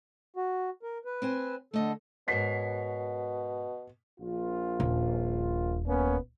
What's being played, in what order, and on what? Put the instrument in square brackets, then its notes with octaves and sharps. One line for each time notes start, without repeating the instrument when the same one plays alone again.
[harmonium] F#4
A#4
B4
[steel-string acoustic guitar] C4 C5 G#5
[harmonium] D3 A4 [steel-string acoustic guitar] A3 D#5
[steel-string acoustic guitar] G#2 A#4 C#5 [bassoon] B2 [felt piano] B6 C7
[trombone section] A#1 F4
[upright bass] D#1
[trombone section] A#3 B3 C#4